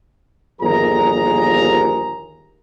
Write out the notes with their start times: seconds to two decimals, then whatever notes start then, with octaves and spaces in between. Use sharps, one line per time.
0.61 G1 D#2 F3 G#4 A#4 A#5